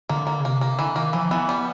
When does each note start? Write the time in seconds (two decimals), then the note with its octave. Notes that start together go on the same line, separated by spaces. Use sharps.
0.09 D3 A#3
0.27 A#3
0.40 C#3
0.45 C3 A#3
0.61 A#3
0.79 D3 E3
0.96 D#3 A#3
1.13 E3 F3
1.31 E3 B3
1.49 G3 B3